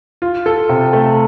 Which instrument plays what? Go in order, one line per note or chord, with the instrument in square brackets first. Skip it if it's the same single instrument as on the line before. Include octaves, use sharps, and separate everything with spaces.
[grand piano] F4
A4
C3
A3